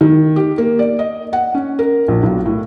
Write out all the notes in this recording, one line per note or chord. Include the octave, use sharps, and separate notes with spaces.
D#3
G4
A#3
D5
D#5
F#5
C#4
A#4
A#1
B1
A2